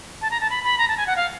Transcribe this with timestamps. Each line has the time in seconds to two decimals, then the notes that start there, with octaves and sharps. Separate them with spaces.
0.21 A5
0.31 A#5
0.41 A5
0.50 B5
0.64 B5
0.78 A#5
0.88 A5
0.97 G#5
1.07 F#5
1.16 F5